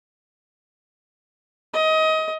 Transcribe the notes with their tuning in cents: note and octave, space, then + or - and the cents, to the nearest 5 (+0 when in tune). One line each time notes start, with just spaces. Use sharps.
D#5 +25